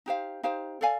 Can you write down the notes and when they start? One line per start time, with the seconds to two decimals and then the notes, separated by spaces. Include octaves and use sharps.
0.06 D#4 G4 C5 F5
0.43 D#4 G4 C5 F5
0.81 A4 D5 F5 G#5